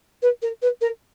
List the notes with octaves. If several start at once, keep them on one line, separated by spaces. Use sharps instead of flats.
B4
A#4
B4
A#4